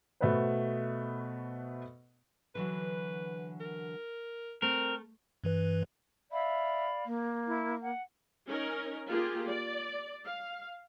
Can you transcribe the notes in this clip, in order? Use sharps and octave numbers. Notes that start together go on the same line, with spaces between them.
B2 A3 B3 F#4 B4 C5
D3 E3 F#3 B4
A#4
A3 C4 A#4
G2 E3 B4
D5 E5 F5 B5
A#3
E4
F#5
C#4 D#4 A#4
A#3 F4 G4 G#4
D5
F5